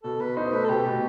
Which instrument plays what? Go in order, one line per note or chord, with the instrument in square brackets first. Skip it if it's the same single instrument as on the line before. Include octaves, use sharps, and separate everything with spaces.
[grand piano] B2 [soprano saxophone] A4
[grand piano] B2 [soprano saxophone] B4
[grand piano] D#4 [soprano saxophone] C5
[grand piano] A3 [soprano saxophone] B4
[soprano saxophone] A4
[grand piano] B2 [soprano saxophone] G4
[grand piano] B2